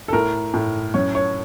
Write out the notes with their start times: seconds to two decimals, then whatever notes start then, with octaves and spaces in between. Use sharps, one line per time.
0.08 A4
0.13 A2 A#4
0.54 A2
0.94 F#2 C#5
1.15 C#5